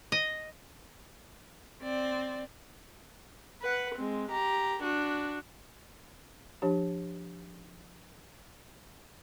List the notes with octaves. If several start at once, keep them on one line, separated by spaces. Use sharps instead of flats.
D#5
C4 D5
B4 F#5
G#3 C4
G4 A#5
D4 F#4
F3 D4 G4